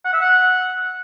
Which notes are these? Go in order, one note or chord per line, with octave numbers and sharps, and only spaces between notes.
F#5
E5
F#5